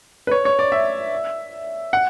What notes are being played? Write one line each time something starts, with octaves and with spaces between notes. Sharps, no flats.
B4
C#5
C#5
D5
E5
F#5